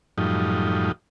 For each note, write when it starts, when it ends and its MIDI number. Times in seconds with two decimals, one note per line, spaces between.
0.18 0.92 42
0.18 0.92 45
0.18 0.92 53
0.18 0.92 55
0.18 0.92 63